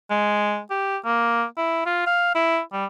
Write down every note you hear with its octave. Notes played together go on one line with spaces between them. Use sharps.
G#3
G4
A#3
E4
F4
F5
E4
G3